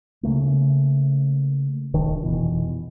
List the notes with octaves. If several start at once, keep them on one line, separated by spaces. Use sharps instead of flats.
C#3 E3 A3 A#3
D#1 D#3 D4
F1 B2 E3